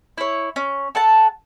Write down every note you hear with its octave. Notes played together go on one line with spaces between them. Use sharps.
E4 C#5
C#4
A4 F#5 A5